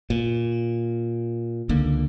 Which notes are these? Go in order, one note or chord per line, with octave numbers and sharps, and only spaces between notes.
A#2
C#2 D3 A#3